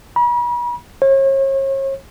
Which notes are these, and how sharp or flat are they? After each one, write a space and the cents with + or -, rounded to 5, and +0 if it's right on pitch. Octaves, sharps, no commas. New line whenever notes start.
B5 -40
C#5 -40